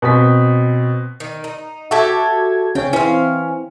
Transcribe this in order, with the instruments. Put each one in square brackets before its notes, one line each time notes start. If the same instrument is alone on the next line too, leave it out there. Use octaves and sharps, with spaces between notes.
[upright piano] B2 C4 B6
[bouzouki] D#3
D#4
[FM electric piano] F#4 G#6 [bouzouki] G4 A4 E5
[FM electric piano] C#3 C#4 [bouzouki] G5
[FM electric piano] E3 C4 [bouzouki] C#4 F5